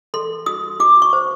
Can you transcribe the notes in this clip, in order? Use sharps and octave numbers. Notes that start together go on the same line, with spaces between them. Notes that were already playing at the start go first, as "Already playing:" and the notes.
A4 C6
F#4 D#6
F#4 D6
C#6
C5